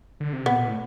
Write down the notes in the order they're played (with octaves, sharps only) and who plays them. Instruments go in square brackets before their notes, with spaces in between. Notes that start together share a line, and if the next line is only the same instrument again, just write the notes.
[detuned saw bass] D3
C3
[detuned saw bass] A#2 [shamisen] B3
[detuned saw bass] A#2
A2